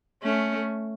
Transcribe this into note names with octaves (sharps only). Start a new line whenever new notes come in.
A3 C#4